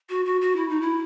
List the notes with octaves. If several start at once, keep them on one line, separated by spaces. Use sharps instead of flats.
F#4
F#4
F#4
E4
D#4
E4